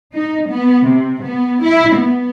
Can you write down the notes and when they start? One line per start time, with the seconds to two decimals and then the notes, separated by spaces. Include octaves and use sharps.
0.13 D#4
0.48 B3
0.86 C3
1.22 B3
1.63 E4
1.95 B3